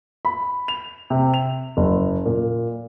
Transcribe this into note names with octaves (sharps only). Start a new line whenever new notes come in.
B5
F7
C3
F7
F#1
A#2